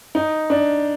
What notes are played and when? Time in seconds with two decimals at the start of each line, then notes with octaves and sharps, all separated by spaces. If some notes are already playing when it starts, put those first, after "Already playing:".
0.15 D#4
0.50 D4